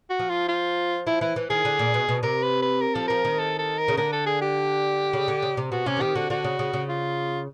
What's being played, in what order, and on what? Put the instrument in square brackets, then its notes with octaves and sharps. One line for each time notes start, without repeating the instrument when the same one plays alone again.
[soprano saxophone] F#4
[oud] F3
[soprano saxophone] F4
F4
[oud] F3 [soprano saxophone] E4
[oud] E3 [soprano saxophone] E4
[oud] E3
[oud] D#3 [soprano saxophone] G#4
[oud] D3
A#2
B2
B2
[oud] C3 [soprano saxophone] A#4
[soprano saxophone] B4
B4
A#4
[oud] F3 [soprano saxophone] A4
[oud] F3 [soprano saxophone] A#4
[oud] D#3
[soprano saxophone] A4
A4
A#4
[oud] C#3
[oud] D3 [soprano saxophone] A#4
[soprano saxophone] A4
G#4
G4
[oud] C#3
D3
C#3
C3
[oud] B2 [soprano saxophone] F#4
[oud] C3 [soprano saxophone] C#4
[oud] E3
[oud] D#3 [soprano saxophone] G4
[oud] D3 [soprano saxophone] F#4
[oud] D3 [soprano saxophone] F#4
[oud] C#3
C#3
C#3
[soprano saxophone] F4